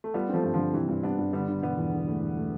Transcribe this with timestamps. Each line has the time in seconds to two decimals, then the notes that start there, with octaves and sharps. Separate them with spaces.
0.04 A3
0.14 G3 B3 F4
0.29 F3 A3 C4
0.44 G2
0.54 D3 F3
0.59 G2
0.73 G2 C3 E3
0.88 G2
1.03 G2 B3 D4
1.19 G2
1.33 D3 G3 B3
1.48 D3
1.62 E1 G3 B3
1.78 E2
1.92 D3
2.07 A3
2.22 E2
2.37 A3